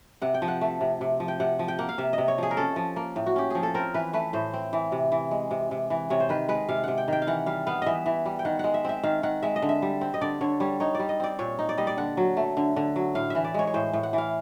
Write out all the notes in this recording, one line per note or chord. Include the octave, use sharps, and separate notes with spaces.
C3 F#5
G5
F3
F#5
A3
C3
C3
F3
G5
C3 F#5
F3
G5
A#3 F#5
F5
C3 E5
D#5
C3
C#5
F3 G#4
A#4
C#4 A4
F3
A#3
A2
F#4
C#4 G4
F3 G#4
A4
C4 A#4
E3 B4
A3 B4
A2 C5
C4
E3
C3
E3
G#3
C3
C3
E3
C3 C#5
C5
D#3 B4
G#3 B4
C3 F5
C3 F#5
G5
D#3 G5
F5
E3 F#5
G3 F5
B3 F5
E3 D#5 E5
E3
G3
G5
D#3 F#5
G#3 F#5
E5
C4 E5
D#3 F5
D#3 F#5
G#3 E5
D#5
D3
E5
G3
C4
D#5
D3 D5
D3 C#5
G3 C#5
D#4 C#5
G3 D5
D#5
C4 D5
A#2 C#5
D#4
D5
G3 D#5
D5
D3 F#5
F#3
A3
D3
D3
F#3
A2 F5
E3 E5
D5
G#3 C#5
C#5
A2 C5
A2
F#5
E3 F5